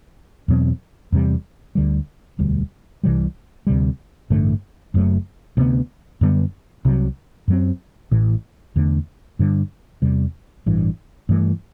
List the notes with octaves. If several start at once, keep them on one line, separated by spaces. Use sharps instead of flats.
E2 B2 F#3 C4
E2 C3 G3
D2 D3 G3
E1 D2 D3 G3
C2 C3 E3 G3
D2 C3 G3
A1 G2 D3 A3
F#1 F#2 F#3 A3
D2 C3 G3 B3
F#2 D3 G3 B3
C2 C3 F#3
F#2 F#3 C4
A1 A2 E3
E2 D3 A3
G2 D3 G3
E2 C3 G3
A1 G2 E3
G2 E3 A3